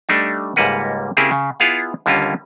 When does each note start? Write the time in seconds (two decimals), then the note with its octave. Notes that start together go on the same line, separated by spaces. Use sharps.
0.09 G3 A3 D4 D#4
0.56 C#2 G#2 G3 A#3 B4 F#5
1.17 C#3 A#3 C4 E4 G4 G#4
1.31 C#3
1.60 B3 E4 F4 G#4 F5 F#5
2.06 D#2 D3 G3 A#3 C#4 F4